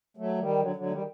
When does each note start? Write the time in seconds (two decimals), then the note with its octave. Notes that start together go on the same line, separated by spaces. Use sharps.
0.17 F#3 A3
0.38 D#3 G3
0.59 D3 F#3
0.76 D3 F#3
0.86 A3
0.91 D#3 G3